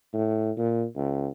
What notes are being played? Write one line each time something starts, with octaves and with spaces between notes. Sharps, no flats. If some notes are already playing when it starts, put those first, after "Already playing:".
A2
A#2
C#2